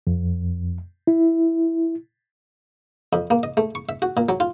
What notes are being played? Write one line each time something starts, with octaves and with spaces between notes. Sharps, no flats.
F2
E4
F2
A#3
D#5
A3
C#6
E5
F#4
A#2
F#3
F4